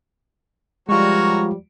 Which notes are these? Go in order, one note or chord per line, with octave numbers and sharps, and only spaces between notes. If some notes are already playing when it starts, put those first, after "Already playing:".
F3 G3 G#3 F4 F#4 A#4 C#5